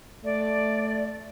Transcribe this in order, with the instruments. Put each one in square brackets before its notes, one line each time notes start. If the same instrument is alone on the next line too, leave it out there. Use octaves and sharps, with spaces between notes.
[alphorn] A3 [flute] D5